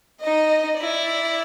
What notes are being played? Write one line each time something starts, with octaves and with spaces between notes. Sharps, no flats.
D#4 D#5
E4 D5